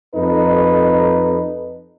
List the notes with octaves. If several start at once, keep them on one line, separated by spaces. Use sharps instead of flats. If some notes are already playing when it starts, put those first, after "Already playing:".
F2 D#4 A4 B4